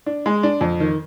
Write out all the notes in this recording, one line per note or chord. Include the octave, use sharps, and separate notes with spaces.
D4
G#3
D4
F2
D#3